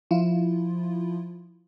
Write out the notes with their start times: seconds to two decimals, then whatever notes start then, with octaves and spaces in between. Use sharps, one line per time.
0.11 F3 E4 F4